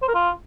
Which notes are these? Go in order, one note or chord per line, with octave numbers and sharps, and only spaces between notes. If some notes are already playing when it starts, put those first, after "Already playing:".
C5
A#4
F4